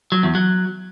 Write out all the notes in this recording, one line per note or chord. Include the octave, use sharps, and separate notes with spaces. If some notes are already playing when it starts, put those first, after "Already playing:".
F#3
E2
F#3